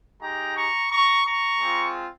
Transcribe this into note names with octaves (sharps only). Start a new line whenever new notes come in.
G#3 D#4 G4 G5 A#5
A#5 C#6
A#5 C#6
A#5 C#6
G#3 C4 F4